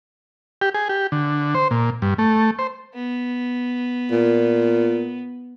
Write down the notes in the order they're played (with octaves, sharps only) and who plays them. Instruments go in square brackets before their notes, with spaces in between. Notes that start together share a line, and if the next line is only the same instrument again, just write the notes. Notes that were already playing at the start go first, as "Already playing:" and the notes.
[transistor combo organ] G4
G#4
G4
D3
C5
A#2
G2
A3
C5
[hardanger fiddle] B3
[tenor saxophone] A#2